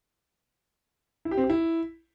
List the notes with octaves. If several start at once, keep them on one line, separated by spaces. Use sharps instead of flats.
E4
G4
C4
G4
E4